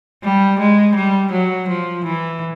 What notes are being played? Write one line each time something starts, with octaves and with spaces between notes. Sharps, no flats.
G3
G#3
G3
F#3
F3
E3